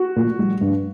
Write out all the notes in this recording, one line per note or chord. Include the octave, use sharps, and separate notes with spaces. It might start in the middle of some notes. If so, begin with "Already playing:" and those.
Already playing: F#4
A#2
G3
G2